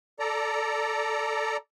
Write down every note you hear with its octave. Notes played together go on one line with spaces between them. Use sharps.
A4 D5 A#5